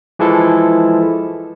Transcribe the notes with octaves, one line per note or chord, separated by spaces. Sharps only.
E3 F3 G#3 E4 A4